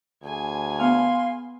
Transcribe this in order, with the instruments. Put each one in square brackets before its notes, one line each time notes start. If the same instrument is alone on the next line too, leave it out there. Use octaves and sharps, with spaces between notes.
[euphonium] D2 [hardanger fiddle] G#4 G#5
[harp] B3 F6 [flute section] F5 C6